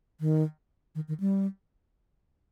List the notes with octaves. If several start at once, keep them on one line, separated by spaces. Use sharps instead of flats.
D#3
D#3
D#3
G3